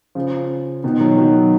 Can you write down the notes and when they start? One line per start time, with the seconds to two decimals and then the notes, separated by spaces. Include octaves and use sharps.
0.15 C#3 F3
0.84 B2 D#3
1.00 D#3 F#3
1.17 D#3 F#3